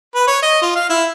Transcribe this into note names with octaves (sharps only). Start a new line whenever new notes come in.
B4
C#5
D#5
F4
F5
E4